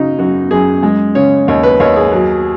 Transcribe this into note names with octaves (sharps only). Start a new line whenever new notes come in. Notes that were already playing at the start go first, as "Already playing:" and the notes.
Already playing: C#3 F#3 D#4
F#2 F#4
F#2 G#4
G#3
C#3 C#5
D#2 C#5
B4
D#2 C#5
G#4
F#3